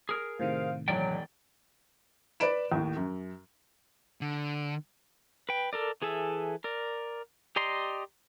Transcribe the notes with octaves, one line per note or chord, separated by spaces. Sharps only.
G#4 A#4
A2 C3 D#3 C5 F5
E1 F#3 C#5 D5 G5
B4 D5 B5 D7 E7
D#2 A2
F#2
D3
B4 G5
A4 A#4 D5
E3 G#4 A4 E5
A#4 D5
G4 D5 D#5 A#5 C6